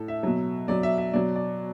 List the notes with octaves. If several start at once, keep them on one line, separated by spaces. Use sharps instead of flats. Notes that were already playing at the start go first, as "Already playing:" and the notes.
Already playing: A2 A4
E5
B2 F#3
B2 F#3 D5
E5
E5
B2 F#3 D5
D5